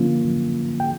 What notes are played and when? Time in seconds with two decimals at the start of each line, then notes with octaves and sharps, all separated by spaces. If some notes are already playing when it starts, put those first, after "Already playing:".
Already playing: D3 F3 A#3 C#4 F4
0.80 G5